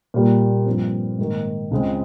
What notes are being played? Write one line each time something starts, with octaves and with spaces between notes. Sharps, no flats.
A#2 G3 A#3
G2 F3 C4
G#2 D#3 A#3
C#2 C#3 G#3 C4